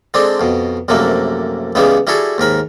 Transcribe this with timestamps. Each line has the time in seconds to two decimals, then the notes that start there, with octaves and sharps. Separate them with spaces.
0.14 D3 G#3 C4 D4
0.40 F2 B2
0.88 A#1 F#2 C3 A3 A#3
1.75 C#2 C#3 E3 G3 G#3 B3
2.07 G3 E4 F#4 G#4 A4
2.38 D#2 G#2 A#4 B5